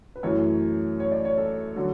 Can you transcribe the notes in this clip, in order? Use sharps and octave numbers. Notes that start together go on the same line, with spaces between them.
B4
F#2 E3 A3 C#5
C#5
D5
C#5
A4
D3 F#3